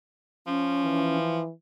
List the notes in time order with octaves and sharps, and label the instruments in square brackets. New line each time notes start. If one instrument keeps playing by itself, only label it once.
[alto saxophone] F3 [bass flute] C#4
[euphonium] E3